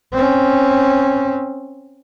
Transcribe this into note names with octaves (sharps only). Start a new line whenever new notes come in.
C4 C#4